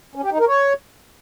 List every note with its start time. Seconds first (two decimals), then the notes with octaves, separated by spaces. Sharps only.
0.15 C#4
0.23 G4
0.31 D#4
0.39 A#4
0.48 C#5